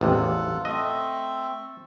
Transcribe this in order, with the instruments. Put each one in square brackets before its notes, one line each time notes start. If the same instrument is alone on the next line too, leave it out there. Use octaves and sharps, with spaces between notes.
[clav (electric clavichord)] A1 E2 C3 [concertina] F4 A4 F#5
[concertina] A3 C4 A4 [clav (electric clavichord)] D#5